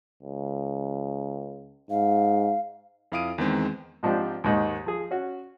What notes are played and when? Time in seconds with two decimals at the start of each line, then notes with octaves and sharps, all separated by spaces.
0.23 C#2
1.90 G#2 F5
3.12 F2 E4 F5 D#6 D7 D#7
3.38 E2 D#3 G#3 C4
4.03 G#2 F3 C4 D4 G4
4.44 D#2 G#2 D#3
4.86 F3 G#4
5.11 C#4 F#4